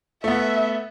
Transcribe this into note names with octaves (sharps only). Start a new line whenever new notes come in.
A3 B3 E5